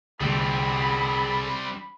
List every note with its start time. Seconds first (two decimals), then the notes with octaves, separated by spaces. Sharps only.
0.21 C2 D3 G3 C4 G#4 A4 G5 B5